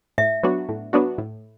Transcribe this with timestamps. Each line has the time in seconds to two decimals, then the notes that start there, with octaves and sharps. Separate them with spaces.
0.18 A2 E5
0.43 F#3 B3 D4 F#4
0.69 A2
0.93 F#3 B3 D4 F#4
1.18 A2